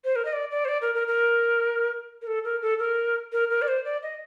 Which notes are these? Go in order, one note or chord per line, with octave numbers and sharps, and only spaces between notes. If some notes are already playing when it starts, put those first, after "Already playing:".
C5
A#4
D#5
D5
D5
C5
D5
A#4
A#4
A#4
A#4
A4
A#4
A4
A#4
A#4
A#4
D5
C5
D5
D#5